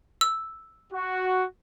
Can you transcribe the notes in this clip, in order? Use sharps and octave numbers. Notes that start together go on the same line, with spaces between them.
E6
F#4